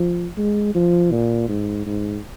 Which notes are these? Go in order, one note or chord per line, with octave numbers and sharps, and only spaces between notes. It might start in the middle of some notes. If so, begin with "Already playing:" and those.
Already playing: F3
G#3
F3
A#2
G#2
G#2